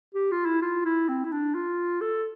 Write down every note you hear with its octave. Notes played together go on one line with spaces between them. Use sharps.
G4
F4
E4
F4
E4
C4
E4
D4
F4
A4